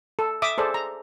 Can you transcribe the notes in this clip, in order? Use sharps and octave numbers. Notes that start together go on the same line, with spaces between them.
A4
E5 D6 D#6
G#4 A4 C5 D5
A#5